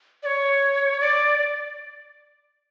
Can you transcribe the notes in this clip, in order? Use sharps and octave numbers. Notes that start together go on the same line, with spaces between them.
D5
C#5
D5